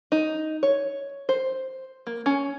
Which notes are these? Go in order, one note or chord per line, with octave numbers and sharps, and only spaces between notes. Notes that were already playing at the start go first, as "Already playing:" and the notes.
D#4
C#5
C5
A#3
C#4